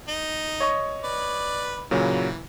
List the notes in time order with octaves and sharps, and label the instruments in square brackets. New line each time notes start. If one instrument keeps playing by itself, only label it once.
[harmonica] D#4
[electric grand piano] C#5 D#5 C#6
[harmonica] B4 D5
[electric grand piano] A#2 C#3 F#3 [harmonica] E3